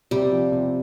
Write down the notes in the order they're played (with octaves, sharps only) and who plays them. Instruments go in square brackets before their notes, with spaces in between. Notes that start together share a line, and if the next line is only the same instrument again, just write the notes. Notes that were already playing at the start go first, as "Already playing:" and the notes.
[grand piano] C3 [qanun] G3
[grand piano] F3
C3